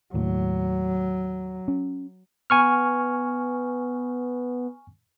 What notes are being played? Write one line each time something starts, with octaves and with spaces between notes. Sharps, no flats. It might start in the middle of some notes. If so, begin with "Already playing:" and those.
D#2 A2 F#3
C#4
B3 G#5 C#6 F6